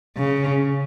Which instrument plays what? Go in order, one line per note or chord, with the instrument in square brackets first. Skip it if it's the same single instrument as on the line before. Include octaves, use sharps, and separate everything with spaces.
[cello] C#3